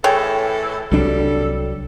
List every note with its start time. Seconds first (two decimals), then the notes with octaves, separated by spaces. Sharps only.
0.04 A2 E3 G#4 A4 C#5 G5
0.92 C2 F#3 G3 D4 A4